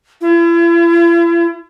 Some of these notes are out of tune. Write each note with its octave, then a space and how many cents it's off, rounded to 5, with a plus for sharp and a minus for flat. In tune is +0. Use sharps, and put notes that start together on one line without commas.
E4 +45